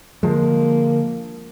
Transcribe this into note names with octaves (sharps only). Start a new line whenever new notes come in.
D3 F3 G#3 A#3